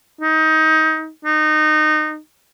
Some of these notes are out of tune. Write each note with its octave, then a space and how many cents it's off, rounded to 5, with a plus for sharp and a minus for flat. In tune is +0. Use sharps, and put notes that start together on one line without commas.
D#4 +20
D#4 -20